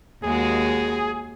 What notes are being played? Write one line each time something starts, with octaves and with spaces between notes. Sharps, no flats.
D#2 G#3 F#4 G#4